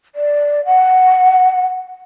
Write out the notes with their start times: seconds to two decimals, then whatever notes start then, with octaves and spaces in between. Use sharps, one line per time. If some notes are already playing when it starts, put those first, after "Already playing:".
0.15 D5
0.66 F#5